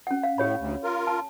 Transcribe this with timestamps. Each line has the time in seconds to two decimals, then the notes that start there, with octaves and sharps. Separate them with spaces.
0.07 C#4 F#5
0.23 F5
0.38 A2 G4 C#5 B5
0.59 D2
0.84 F4 A#4
1.07 A5